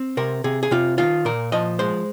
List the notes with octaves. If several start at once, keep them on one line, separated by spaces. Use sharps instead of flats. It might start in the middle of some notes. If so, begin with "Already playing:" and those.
Already playing: C4
C3 A#4
C3 G#4
G#4
C3 F4
D#3 F4
A#2 A#4
F3 D#5
G#3 C5